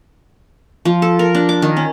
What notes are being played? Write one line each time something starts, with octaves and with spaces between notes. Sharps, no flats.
F3
A4
A#4
D4
D6
D#3
C#4